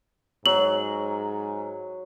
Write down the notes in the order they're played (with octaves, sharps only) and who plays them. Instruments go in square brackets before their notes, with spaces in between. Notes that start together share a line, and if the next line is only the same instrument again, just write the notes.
[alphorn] G#2 [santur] F#3 [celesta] F#7